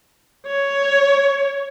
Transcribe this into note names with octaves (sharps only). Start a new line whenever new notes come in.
C#5